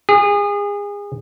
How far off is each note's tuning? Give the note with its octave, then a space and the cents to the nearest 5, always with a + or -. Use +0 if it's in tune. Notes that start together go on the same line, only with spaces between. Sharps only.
G#4 -30